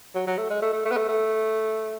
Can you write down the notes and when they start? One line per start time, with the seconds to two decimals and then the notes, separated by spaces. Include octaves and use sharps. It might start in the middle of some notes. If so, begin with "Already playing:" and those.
0.15 F#3
0.27 F#3
0.38 A3
0.50 G#3
0.62 A3
0.73 A3
0.85 A3
0.92 B3
0.97 A3
1.09 A3